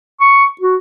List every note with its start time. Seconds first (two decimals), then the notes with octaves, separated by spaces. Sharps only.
0.21 C#6
0.61 F#4